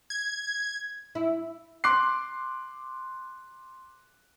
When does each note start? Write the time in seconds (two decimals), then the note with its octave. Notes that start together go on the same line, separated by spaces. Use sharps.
0.10 G#6
1.15 E4
1.84 C6 D6 F#6 C7